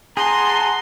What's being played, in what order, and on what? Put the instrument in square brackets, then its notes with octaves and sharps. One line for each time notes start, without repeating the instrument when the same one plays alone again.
[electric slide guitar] G#4 [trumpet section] F#5 A5 A#5 [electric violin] C6